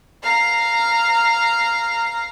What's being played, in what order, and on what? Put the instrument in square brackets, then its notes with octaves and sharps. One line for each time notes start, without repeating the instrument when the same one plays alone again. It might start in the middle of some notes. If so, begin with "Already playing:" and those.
[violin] F5 A#5